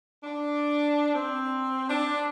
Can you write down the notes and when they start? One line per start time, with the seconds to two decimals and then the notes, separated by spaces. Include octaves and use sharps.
0.23 D4
1.15 C4
1.89 D4